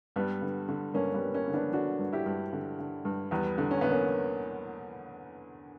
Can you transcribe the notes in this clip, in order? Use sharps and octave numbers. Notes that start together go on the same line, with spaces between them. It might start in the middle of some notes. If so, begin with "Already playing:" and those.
G2 G3 B3
D3
D3
G2 A#3 C#4
G3 B3
G2
A#3 C#4
D3
B3 D4
D3 D4 F#4
G2
E4 G4
G2
D3
D3
G2
E2 G3 B3
D3
C#4
D3 B3
A#3 C#4